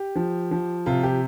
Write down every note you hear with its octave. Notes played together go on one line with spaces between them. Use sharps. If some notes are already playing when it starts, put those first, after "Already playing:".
Already playing: G4
F3
F3
C3 F4
G4